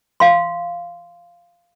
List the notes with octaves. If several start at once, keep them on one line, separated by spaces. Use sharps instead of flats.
F5 C6